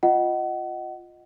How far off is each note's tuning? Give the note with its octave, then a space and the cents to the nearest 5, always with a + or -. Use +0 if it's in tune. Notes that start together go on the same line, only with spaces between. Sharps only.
F4 +0 D#5 +0 F#5 +25